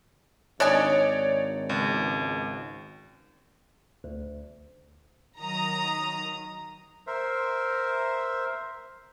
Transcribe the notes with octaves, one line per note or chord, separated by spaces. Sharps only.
G#1 D4 D#4 C#5 D5 G#5
C#2
D2
D#3 F#3 A#5 D#6
A#4 C5 E5